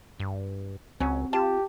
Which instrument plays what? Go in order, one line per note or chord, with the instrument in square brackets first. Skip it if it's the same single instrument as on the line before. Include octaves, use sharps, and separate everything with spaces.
[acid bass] G2
[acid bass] C#2 [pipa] F#3 C#4 [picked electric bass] C4
[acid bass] F4 [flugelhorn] G4 [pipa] A5